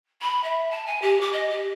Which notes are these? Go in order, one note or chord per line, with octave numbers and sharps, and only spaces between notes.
B5
E5
A5
G#5
G4
D6
D#5
G4